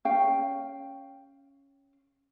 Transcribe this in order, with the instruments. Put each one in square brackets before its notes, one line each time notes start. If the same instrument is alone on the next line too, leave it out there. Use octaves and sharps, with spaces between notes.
[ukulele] C#4 F5 G5